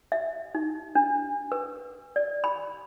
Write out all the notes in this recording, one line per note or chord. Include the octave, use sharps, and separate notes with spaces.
E5
D#4
D4
B4
D5
B5